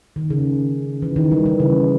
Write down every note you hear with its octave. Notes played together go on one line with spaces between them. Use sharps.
D#3
C#3
E3
D#3
G3
E3
C#3